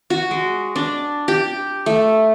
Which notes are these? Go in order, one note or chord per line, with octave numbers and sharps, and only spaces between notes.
F#4
G#3
D4
G4
A3